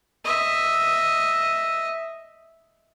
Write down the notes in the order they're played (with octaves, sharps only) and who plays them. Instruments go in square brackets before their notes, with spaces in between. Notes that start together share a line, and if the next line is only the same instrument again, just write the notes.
[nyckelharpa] D#5 E5